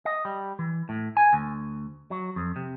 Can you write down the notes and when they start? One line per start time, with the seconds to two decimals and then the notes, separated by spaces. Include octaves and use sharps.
0.05 D#5
0.25 G3
0.59 E3
0.89 A2
1.17 G#5
1.33 D2
2.11 F#3
2.36 F2
2.56 C3